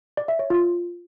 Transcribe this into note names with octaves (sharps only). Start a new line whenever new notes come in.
D5
E5
C#5
F4